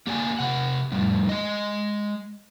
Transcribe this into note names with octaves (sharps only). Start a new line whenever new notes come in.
A#3 G4 D5 G#5
C3 F#5
F2 A2 G3
G#3 D#5